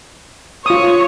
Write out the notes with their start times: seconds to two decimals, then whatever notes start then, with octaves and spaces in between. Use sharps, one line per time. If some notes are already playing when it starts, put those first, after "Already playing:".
0.66 F4 C#5 D#6